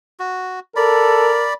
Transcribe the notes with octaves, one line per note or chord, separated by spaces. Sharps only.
F#4
A4 A#4 D5 B5